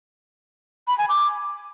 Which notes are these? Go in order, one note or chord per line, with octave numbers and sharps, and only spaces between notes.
B5
G#5
D6